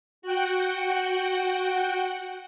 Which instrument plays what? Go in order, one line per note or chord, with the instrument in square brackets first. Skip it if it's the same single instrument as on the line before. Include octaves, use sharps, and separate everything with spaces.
[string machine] F#4 F#5 G5